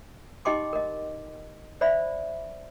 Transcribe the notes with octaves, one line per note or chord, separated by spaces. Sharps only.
D#4 G4 D#5 G5 C6 D6
A#4 D#5
C5 D5 E5 B5